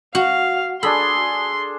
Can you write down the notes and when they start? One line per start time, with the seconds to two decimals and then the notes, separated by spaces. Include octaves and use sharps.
0.15 F#4 F5
0.83 D4 G#4 A4 B5 C6